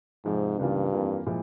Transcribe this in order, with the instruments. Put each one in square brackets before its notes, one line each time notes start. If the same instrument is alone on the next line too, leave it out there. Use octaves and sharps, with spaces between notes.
[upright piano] F2 C3 F3 G#3 [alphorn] G#2
[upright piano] C#2 C#3 E3 A#3 F4 [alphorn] G2
[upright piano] F2 E3 A#3 F4
A#2 F3 G#3 E4